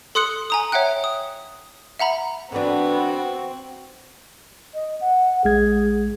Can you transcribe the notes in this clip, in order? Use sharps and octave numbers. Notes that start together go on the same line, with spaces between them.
A4 C6 D#6 F#6 C#7 F#7
G#5 A#5 D#6
C#5 E5 F#5 G5 F#6
D#6
E5 F#5 A#5 B5
D3 E3 B3 C4 D4 F#4
D#5
F#5
A#1 G#3 G#4 G#6